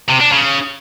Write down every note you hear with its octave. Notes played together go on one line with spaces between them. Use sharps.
C3
D4
C#3